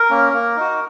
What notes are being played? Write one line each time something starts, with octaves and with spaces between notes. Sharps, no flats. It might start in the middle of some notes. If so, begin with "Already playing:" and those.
Already playing: A#4
A#3 C#4
A#3
D#4 F#4